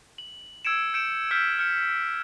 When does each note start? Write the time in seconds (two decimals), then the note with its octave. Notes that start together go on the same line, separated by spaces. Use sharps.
0.18 F#7
0.65 E6 G#6 C#7 D7 E7
0.94 G6 C#7 D7 E7
1.31 E6 F6 G6 B6
1.59 F6 G6 C#7